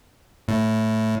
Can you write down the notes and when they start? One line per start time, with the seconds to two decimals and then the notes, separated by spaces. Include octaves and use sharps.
0.48 A2